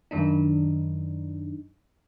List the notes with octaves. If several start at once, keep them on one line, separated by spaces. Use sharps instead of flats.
F#2 D#3 D4 D#4